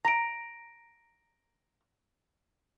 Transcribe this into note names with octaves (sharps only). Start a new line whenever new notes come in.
A#5 A#6 D7